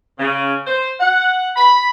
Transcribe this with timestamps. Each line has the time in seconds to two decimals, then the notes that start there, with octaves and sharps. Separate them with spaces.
0.19 C#3
0.66 C5
1.00 F#5
1.56 B5